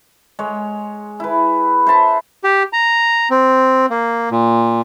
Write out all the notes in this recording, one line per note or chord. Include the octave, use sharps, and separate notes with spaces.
G#3 C#5
E4 B4
C5 E5 A5 B5
G4
A#5
C4
A#3
A#2